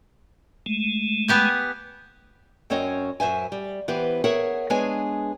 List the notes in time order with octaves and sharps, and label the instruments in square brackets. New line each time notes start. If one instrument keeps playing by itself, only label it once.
[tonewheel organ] G#3 A3
[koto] B3 G4 G#5
[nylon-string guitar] F#2 C4 C#4 C#5 D#5
F#2 C5 E5 G#5
G3
E3 B3 G4 C5
G#4 A#4 C#5 E5 F#5
G#3 B3 D4 G#4 C#5 G#5